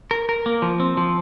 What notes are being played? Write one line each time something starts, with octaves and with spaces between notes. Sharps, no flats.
A#4
A#4
A#3
F3
C4
F3